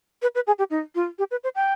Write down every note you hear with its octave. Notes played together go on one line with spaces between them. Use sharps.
B4
B4
G#4
G4
D#4
F4
G4
B4
C5
G5